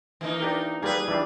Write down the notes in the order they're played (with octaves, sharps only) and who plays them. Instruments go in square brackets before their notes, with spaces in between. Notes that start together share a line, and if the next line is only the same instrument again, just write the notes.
[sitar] E3 A#3 D#4
[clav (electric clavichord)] D4 G4 A#4
[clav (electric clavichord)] G3 A#3 [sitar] G#4 B4
[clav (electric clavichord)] E3 G3 D4